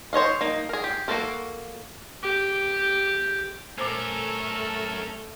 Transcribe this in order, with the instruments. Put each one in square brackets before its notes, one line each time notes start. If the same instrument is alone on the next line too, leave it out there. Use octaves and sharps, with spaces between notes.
[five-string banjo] C5 C#5 D#5 F5
A#3 D#4
G#4 A#4
G4
A#3 C#4 F#4 A4 A#4
[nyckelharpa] G4
[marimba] A#2 C5 [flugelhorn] A3 [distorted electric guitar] C#4 A#4 [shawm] A4